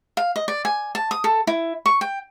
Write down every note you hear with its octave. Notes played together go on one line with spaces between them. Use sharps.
F5
D#5
D5
G#5
A5
D#6
A4
E4
C#6
G5